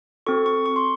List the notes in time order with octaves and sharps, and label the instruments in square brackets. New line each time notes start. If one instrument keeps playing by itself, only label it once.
[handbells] C4 F#4 A4 C#6
C#6
C#6
C6